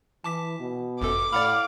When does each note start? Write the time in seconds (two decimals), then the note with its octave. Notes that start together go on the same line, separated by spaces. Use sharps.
0.24 E3 A5 D6 B6
0.59 B2
1.01 G1 F#2 A4 D6
1.32 A2 D5 F5 F#5 B5